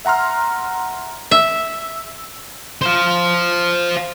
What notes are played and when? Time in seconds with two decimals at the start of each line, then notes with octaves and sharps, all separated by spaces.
0.05 E5 F#5 A#5 C6 F6
1.31 E5
2.82 C5 F5